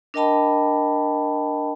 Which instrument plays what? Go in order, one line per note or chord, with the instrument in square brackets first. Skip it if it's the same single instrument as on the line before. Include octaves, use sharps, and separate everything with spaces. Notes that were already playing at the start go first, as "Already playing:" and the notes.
[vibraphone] D4 A#4 D#5 G5 A5 B5